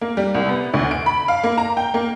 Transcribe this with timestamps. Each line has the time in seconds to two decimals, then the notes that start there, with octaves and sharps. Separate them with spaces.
0.01 A#3
0.17 G3
0.35 C2
0.49 B3
0.74 D2
0.91 D7
1.06 B5
1.28 F5
1.44 A#3
1.58 A#5
1.77 G5
1.94 A#3